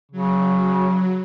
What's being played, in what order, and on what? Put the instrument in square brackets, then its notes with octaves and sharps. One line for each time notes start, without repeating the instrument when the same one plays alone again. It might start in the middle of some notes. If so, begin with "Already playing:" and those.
[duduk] C#3 [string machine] F#3